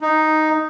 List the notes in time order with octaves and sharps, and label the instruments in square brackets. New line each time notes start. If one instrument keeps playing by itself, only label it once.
[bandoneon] D#4